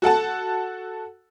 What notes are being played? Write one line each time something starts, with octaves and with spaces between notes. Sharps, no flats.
F#4 A4 F#5 A5